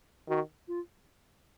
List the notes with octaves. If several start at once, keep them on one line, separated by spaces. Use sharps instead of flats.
D#3 F#4
F4